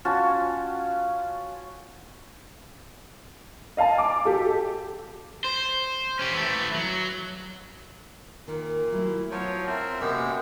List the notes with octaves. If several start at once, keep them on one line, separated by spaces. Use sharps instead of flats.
C#4 F4 F#4 A5
D#5 F5 G#5 A5
D6
F#4 G4 A4
C5
C#4 G4
E3 A3
F#3
A#2 D#3
F#3 A3 E4
F3 F#3 B3 C#5
C4 F4 A#4 E5
F#2 C3 G#3 A#3 B3 G4